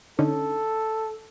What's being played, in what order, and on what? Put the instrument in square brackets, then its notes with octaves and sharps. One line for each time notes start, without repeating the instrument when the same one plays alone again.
[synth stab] D3 C#4 D#4 [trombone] A4